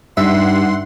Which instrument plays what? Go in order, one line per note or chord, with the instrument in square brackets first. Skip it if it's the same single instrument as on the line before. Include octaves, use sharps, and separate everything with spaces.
[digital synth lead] G2 [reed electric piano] G3 D#4 [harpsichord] E5 [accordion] F#5 C6